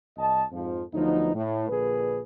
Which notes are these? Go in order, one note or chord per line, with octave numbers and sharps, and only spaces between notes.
C2 D#5 A5
F2 G#2 F3
D2 F3 F#3 B3 D#4
A2
A#1 A#2 D3 G#4 B4